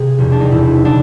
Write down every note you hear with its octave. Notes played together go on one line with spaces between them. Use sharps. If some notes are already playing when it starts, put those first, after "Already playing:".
Already playing: C3 G#4
F1 E2 B2
D4
D#4
F1 E2 B2 E4
C#3 D4